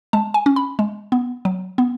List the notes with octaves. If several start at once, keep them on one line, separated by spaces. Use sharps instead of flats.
G#3 A5
G#5
C#4
B5
G#3
B3
F#3
B3